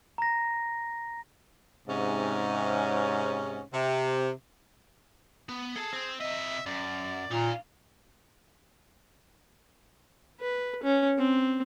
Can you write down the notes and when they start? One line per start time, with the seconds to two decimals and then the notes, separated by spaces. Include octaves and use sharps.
0.18 A#5 A#6
1.88 G#2 C3 C#4
3.73 C3
5.49 B3
5.76 G#4 A4 A5
5.93 C4
6.20 C3 D#5 E5
6.66 F#2 D5
7.31 A#2 D#4 F5
10.40 B4
10.83 C#4
11.18 C4